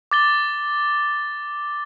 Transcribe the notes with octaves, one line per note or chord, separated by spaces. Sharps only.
D6 A6 G7